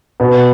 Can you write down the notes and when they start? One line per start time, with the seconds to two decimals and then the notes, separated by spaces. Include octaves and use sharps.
0.20 B2 B3